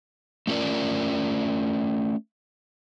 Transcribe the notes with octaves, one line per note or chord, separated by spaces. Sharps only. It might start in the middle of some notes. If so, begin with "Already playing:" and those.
A3 C#4 F4 A#4 D5